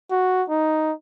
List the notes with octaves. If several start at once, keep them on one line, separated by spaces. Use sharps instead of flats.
F#4
D#4